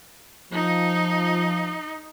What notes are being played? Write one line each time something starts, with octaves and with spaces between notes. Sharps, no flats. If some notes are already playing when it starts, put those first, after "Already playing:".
F3 D#4